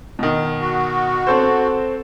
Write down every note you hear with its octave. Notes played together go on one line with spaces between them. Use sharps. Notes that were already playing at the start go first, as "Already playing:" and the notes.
B2 D#3
F#4
C4 A4 C5